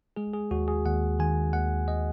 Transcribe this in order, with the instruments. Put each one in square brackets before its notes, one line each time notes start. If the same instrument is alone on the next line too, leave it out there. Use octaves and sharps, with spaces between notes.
[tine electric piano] G#3 G#4
G#4
D#2 F#4
G#4
D#2 F#5
D#3 G#5
D#2 F#5
D#5